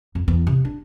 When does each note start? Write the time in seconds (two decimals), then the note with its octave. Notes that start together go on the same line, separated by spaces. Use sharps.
0.15 F2
0.28 E2
0.47 C3
0.65 D4